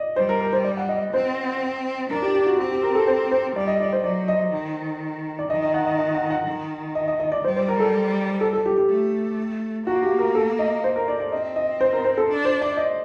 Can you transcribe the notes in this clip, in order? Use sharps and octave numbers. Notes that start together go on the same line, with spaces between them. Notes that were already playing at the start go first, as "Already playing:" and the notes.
Already playing: D5 D#5
G3 C5
A#4
A#4
C5
D5
F#5
D#5
C4 C5
D4 A#4
G4
G4
F#4
C4 G4
G4
A#4
A4
C5
C5
G3 D5
D#5
D5
C5
F#3 D5
D#5
D#3
D5
D#3 D#5
D#5
F#5
D#5
D#5
F#5
F#5
D#3
D#5
D#5
D#5
D5
G3 C5
C5
A#4
A4
A4
A4
G4
G4
A3
A#3 F#4
G4
A#4
A4
D#5
C5
A#4
D5
D5
C4 D#5
D#5
C5
A#4
C5
A4
D4
C5
D5
D#5